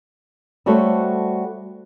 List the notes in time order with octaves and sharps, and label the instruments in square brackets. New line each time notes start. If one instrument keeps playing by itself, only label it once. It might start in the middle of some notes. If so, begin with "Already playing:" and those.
[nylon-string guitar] G3 A3 F#4 A4 C5 C#5